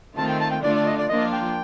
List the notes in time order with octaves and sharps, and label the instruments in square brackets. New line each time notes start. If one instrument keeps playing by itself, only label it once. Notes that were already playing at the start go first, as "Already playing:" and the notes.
[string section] D#3 A3 C4 F4 [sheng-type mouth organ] A5
[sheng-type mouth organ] G5
A5
G5
[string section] D3 A3 D4 F4 [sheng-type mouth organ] D5
[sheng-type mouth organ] D5
D#5
D5
[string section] F3 A#3 D4 F4 [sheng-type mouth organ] D#5
[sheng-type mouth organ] G5